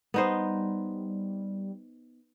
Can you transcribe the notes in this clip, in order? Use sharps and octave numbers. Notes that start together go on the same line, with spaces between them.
G3 B3 D#4 C5